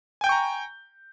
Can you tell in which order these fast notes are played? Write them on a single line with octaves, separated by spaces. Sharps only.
G#5 G5 G6 C#6 A#5